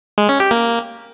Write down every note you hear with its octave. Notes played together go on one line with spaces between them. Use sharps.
G#3
C#4
G4
A#3